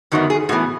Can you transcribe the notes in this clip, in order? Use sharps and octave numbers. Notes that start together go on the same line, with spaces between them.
F#2 D#3 F#3 B3
G#4
A2 E3 B3 F#4